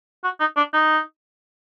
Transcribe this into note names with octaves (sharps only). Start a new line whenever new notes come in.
F#4
D#4
D4
D#4